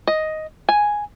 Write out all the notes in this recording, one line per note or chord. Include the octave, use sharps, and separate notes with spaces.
D#5
G#5